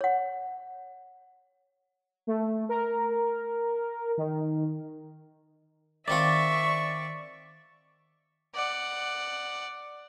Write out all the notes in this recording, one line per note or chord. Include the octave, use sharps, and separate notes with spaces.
C#5 F#5
A3
A#4
D#3
D#3 C4 F4 D5 E5 C#6
D5 F#5